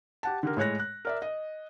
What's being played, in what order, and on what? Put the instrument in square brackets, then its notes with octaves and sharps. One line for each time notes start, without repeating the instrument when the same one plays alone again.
[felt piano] G4 F#5 A5
D3 G4 A#4
A2 G#3 C#5 F#6 A#6
F#6
A#4 D5 E5
D#5